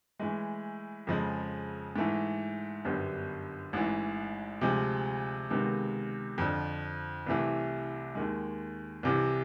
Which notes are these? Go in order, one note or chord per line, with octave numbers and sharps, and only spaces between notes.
A2 E3 G#3
F2 C#3 F3 G#3
G#2 E3 A3
G1 F#2 D3 G3 B3
A1 G#2 E3
D2 C3 F3 G#3
C#2 C3 D#3 G#3 B3
F2 D3 F3
C2 C3 E3 A3
D#2 D#3 G#3
C2 C3 E3